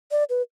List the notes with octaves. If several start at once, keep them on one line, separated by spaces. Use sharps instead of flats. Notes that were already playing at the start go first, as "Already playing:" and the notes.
D5
B4